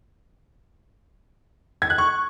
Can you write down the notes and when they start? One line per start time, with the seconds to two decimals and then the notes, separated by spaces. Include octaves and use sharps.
1.82 G#6
1.90 F#6
1.98 C#6